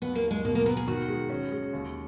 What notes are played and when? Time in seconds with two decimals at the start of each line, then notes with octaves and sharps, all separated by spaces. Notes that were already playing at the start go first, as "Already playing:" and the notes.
0.02 D#2 B3
0.15 A#3
0.24 D#2
0.31 G#3
0.45 B2 A#3
0.55 A#3
0.66 B3 A#4
0.77 G#4
0.88 D#3 F#4
1.08 G#3
1.30 C#4
1.52 G#3
1.73 D#2